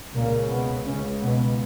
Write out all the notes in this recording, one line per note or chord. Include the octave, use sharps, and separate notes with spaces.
C#2 A#2 C#3 A#3
B2 B3
C#3 C#4
B2 B3